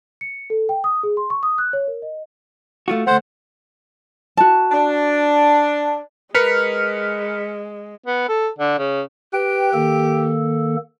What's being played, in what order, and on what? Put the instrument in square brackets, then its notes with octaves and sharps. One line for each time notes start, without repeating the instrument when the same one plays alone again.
[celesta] C#7
A4
G5
D#6
G#4
C6
C#6
D#6
F#6
C#5
A#4
D#5
[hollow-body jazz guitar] A3 F4 F#4
[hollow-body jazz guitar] D2 A3 [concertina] C5 F#5
[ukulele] F#4 A5
[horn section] D4
[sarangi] G#3 [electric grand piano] A#4 B4 [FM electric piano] F6 B6 C#7
[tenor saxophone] B3
A4
D3
C#3
[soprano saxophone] G4 [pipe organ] B4 G5
[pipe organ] D#3 A#3 A4